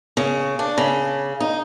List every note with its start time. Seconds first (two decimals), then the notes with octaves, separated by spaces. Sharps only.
0.17 C#3
0.59 D4
0.78 C#3
1.40 D#4